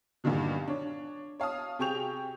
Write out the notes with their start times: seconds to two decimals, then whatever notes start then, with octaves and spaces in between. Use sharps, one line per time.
0.24 G2 A#2 D3 D#3 F3
0.68 D4 C#5
1.40 C#5 F5 A5 D#6
1.79 C3 G#4 G5 C#6 G6 F7